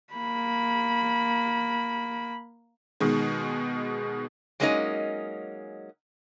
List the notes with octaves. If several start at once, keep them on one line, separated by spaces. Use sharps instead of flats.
A#3 B5
B2 D#3 G#3
F#3 G#3 A#3 C#4 D#4 D#5